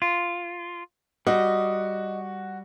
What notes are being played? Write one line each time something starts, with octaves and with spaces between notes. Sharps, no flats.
F4
G3 F#4 D#5